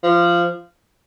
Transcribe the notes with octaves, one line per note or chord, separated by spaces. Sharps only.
F3